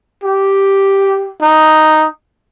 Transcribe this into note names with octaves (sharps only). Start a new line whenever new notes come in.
G4
D#4